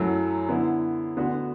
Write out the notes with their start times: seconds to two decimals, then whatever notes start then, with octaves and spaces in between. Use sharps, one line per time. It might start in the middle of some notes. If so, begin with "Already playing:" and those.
Already playing: F#2 F#3 A3 E4
0.48 D3 B3 E4
1.17 D2 D3 B3 F#4